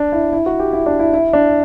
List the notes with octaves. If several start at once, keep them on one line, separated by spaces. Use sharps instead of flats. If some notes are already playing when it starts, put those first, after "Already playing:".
Already playing: D4
E4
E4
F#4
G4
E4
D4
E4
E4
D4